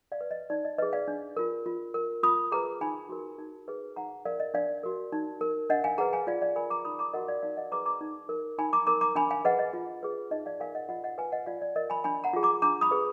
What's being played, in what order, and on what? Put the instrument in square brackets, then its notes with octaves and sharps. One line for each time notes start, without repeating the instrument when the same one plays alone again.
[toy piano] D5 F5
B4
D#5
D#4 D5
D#5
G#4 B4 D#5
D5 F5
D4
F4 A#4
F4
A#4
F4 B5 D#6
G#4 B4 A#5 D6
D#4 G#5 B5
F#4 A#4
D#4
G#4 B4
D#4 F#5 A#5
A#4 D5 F5
D#5
D4 D5 F5
F#4 A#4
D#4
A#4
D4 D#5 F#5
F5 G#5
G#4 B4 F#5 A#5
F5 G#5
F4 D5 F5
D5 F5
A#4 G#5 B5
A#5 D6
D#4 B5 D#6
A#5 D6
F#4 A#4 D#5 F#5
D5 F5
D#4 D5 F5
D#5 F#5
G#4 B4 A#5 D6
A#5 D6
D#4
A#4
D#4 G#5 B5
A#5 D6
A#4 A#5 D6
A#5 D6
D4 G#5 B5
F5 G#5
G#4 B4 D#5 F#5
D#5
F4
G#4 B4
D#4 D#5
D5 F5
A#4 F5 G#5
D#5 F#5
F4 D#5 F#5
D#5 F#5
B4 F5 G#5
D#5 F#5
F4 D5 F5
D5
A#4 D#5
G#5 B5
D4 G#5 B5
F#5 A#5
F4 G#4
A#5 D6
D4 A#5 D6
B5 D#6
G#4 B4